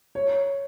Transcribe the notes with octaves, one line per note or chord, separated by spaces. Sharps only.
C#5